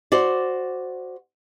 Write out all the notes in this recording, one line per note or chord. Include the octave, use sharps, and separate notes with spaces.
F#4 C5 D5